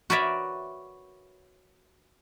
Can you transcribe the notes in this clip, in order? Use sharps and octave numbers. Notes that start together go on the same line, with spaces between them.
F#4 A#4 B4 C#5 D5 E5